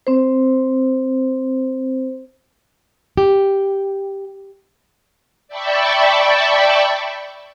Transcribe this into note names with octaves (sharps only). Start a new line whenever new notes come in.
C4 C5
G4
D5 E5 G5 A5 B5 C#6